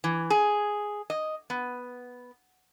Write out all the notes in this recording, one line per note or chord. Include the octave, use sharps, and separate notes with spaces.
E3
G#4
D#5
B3